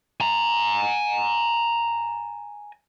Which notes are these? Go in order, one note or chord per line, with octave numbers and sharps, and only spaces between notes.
G#5 A#5